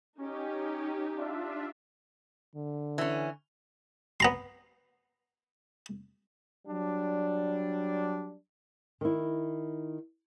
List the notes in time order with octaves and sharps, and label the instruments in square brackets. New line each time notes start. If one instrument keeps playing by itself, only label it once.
[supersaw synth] C#4 [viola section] D#4 G4
[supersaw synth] D4 F4 E5
[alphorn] D3
[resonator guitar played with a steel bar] E3 C#4
[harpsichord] B3 A#5 C6
[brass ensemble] F#3 G3 D4
[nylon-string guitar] D#3 E4